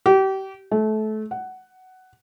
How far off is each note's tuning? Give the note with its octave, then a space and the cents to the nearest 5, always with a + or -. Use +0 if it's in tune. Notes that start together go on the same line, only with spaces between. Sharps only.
G4 -30
A3 -25
F#5 +10